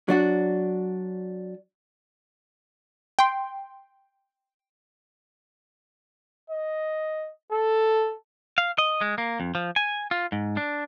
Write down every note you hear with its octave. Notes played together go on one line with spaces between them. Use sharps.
F#3 D4 F#4
G5 C6
D#5
A4
F5
D#5
G#3
A#3
F2
F3
G#5
F4
G#2
D4